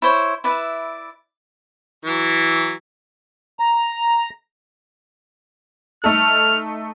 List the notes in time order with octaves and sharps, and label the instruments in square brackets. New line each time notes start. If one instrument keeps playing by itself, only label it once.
[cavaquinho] E4 C5 C#5
E4 B4 D5 E5
[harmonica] E3 F#3
[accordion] A#5
[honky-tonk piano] A3 D#4 A4 [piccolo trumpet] F6